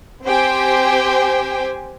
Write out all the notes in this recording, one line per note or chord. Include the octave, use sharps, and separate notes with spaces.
C4 G4 C5 G5 G#5